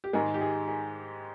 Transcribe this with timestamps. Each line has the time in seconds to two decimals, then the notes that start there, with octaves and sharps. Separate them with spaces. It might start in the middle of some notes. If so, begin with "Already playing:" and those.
0.04 G4
0.13 G#2 D#3 G#3 G#4
0.34 G4
0.41 G#4
0.68 G#4